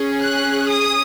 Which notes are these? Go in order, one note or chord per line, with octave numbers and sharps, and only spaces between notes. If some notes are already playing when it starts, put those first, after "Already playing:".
Already playing: C#4 G#4
F#6
D#6